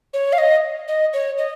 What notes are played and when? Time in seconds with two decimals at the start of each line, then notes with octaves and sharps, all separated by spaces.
0.14 C#5
0.33 F5
0.38 D#5
0.88 D#5
1.13 C#5
1.38 D#5